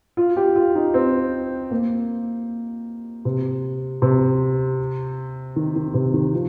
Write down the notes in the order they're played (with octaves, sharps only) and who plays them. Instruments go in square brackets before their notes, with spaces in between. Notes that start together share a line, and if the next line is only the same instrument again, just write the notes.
[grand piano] F4
G4
F4
D#4
C4
A#3
C3
C3
D#3
D#3
C3
D#3
F3